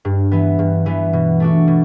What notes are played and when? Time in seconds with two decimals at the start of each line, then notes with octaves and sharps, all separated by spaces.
0.05 G2
0.31 E3 B3
0.59 G2
0.86 E3 B3
1.13 B2
1.40 A3 D4 F#4
1.68 B2